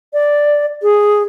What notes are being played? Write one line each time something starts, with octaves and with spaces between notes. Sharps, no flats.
D5
G#4